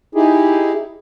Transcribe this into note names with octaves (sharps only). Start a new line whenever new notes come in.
D#4 E4 G4 G#4